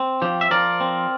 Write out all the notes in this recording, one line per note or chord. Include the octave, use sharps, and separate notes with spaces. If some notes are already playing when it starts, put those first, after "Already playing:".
Already playing: C4
F3 G4
E5
F3 A#4 D5
C4